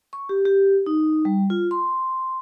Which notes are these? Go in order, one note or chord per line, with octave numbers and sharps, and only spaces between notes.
C#6
G4
G4
D#4
G3
F4
C6